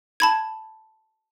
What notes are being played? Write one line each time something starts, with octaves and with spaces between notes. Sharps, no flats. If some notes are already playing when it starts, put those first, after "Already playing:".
A5 B5 G#6